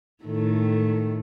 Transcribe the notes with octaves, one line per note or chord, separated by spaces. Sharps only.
A2 D#3 A3